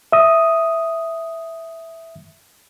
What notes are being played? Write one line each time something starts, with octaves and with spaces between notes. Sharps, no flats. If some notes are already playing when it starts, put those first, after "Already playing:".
E5 D#6